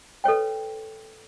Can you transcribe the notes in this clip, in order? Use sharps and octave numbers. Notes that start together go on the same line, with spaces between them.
A4 B4 C#5 G5